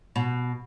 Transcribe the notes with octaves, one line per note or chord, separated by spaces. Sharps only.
B2